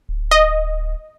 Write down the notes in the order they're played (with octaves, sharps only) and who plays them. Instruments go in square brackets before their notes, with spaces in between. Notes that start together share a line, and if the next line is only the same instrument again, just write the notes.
[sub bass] D1
[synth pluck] D#5